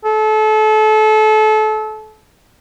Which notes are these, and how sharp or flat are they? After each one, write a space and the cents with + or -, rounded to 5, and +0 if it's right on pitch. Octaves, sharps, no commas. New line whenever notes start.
A4 -30